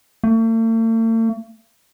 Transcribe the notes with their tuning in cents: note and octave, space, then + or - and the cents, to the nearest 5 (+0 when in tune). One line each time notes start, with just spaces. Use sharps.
A3 +45